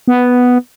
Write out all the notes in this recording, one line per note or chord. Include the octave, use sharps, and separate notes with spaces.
B3